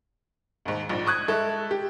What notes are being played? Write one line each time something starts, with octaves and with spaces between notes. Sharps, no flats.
D#2 G#2
A#1 G#2
C#6 D#6 F#6 G#6
G#3 E4 A4
G4